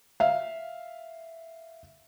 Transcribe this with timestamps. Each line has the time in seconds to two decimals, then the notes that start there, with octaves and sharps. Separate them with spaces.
0.20 E5 F5